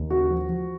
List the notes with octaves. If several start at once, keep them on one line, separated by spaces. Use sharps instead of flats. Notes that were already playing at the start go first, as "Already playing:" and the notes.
Already playing: D#2
C#3 F#4
F3
F3